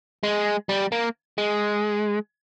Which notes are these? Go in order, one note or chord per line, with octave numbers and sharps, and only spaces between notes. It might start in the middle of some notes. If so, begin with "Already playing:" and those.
G#3
G3
A#3
G#3